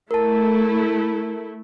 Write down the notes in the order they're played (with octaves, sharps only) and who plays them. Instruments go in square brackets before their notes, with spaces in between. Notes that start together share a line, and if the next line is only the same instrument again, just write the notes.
[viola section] A3 E4 [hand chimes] A#4 A5